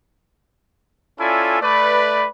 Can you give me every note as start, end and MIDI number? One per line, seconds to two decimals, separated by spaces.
1.19 1.61 61
1.19 1.61 64
1.19 1.61 65
1.19 1.61 69
1.19 1.61 74
1.19 1.61 80
1.61 2.27 57
1.61 2.27 71
1.61 2.27 74